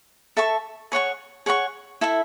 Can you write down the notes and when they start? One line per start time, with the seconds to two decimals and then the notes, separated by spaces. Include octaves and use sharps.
0.37 A4 E5 A5 C#6
0.92 G#4 C#5 F#5 C#6
1.46 G#4 C#5 F#5 C#6
2.01 E4 A4 E5